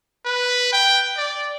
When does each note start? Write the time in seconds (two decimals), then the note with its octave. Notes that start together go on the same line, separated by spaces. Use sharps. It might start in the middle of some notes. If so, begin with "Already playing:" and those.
0.25 B4
0.72 G5
1.17 D5